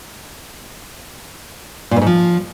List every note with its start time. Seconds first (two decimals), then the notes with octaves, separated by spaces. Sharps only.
1.91 A#2
1.96 G2
2.01 G#2
2.06 F3